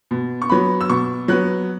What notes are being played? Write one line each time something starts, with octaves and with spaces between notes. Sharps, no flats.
B2
C#6
F#3 B3 B5
E6
B2 C#6
F#3 B3 F#6